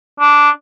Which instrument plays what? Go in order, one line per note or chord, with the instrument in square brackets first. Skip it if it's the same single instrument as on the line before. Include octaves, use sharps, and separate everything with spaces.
[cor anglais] D4